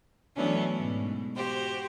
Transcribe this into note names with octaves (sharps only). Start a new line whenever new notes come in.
E3 F#3 A3 B3 C#4 D4
G#2 B2
F#4 G4 C5